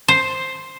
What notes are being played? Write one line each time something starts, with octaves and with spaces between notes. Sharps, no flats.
C5